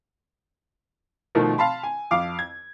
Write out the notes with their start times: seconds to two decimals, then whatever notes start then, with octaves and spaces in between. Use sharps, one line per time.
1.35 B2 D#3 F3 A3 A#4
1.58 F5 A5 B5 C6
1.83 G#5
2.11 F2 F5 D6
2.39 G#6